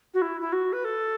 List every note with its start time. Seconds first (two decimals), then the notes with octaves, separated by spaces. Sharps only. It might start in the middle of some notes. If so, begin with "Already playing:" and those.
0.14 F#4
0.21 E4
0.41 E4
0.52 F#4
0.72 B4
0.84 A4